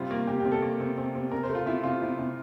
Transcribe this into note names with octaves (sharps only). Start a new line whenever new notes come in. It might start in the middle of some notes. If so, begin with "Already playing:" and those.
Already playing: C3 G3 F4
A#3
C3 G4
C3 G4
A4
A#3
C3
C3
C3
C3 A#4
C5
A3
F4
C3 E4
C3 F4
C3 E4
C3